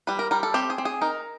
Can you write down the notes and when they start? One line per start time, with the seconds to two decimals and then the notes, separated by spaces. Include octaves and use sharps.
0.07 G3 B4
0.19 A#4
0.31 G3 A#4
0.43 A4
0.54 C4 G4
0.70 G#4
0.78 C4
0.85 G#4
1.01 D#4 A#4